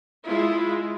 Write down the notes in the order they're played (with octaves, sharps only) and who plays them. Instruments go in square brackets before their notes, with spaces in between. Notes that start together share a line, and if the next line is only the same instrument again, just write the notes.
[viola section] G#3 E4 F4